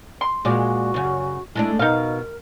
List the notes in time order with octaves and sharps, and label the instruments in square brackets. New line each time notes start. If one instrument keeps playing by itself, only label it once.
[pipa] C6
[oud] A#2 G#3 D5 [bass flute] F#4
[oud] F#2 C#3
[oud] G#3 A3 D4 [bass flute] E4
[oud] B2 [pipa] D#4 F5 [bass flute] A#4